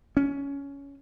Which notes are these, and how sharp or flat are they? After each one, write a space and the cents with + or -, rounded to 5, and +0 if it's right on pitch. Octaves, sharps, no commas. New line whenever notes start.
C#4 +15